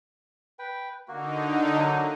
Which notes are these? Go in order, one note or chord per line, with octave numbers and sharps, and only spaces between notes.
B4 G5
D3 A#3 D#4 F#4
F#3 A#3 F#4